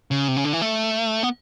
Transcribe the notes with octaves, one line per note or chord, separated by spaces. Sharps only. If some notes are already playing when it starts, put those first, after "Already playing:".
C#3
C3
C#3
D3
E3
A3
B3